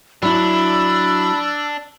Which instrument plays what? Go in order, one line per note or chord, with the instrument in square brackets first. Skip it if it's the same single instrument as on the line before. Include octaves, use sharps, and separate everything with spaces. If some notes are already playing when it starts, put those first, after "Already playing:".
[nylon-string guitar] F#3 E4 [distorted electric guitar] D4 [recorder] B5 [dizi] E6